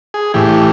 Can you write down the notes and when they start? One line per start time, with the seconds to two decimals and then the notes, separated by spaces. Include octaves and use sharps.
0.14 G#4
0.34 A2 E3 G4